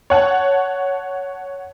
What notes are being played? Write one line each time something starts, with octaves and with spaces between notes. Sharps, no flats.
C#5 F#5 A5